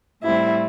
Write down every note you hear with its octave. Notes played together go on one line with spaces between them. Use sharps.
A2 G3 C4 E4